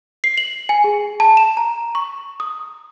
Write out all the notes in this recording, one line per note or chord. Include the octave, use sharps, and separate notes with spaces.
C7
F#7
G#5
G#4
A5
E7
A#5
C#6
D#6